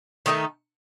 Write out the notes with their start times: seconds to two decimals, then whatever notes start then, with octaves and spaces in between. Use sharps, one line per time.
0.26 D#3 A3 D#4 A4